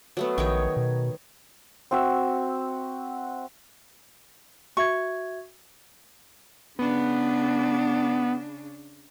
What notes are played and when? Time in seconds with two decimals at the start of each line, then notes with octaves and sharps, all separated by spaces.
0.17 F#3 A3 B3
0.38 A#1 D#3 D#4 C#5
0.77 B2
1.91 C4 F#4 E5
4.77 F#4 E5 C#6 G#6
6.79 C#3 B3 D4